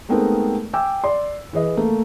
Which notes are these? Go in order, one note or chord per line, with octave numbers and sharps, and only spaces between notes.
G#3 A3 B3 C4 D#4 A#4
G5 G#5 D6 E6
D5 C6
E3 G#4 B4 D#5
A3 A#3